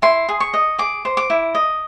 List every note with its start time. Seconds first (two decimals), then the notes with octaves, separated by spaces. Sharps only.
0.02 E4 C6
0.29 G#4
0.40 C#6
0.54 D#5
0.78 G#4 D6
1.05 C5
1.17 D6
1.30 E4
1.55 D#5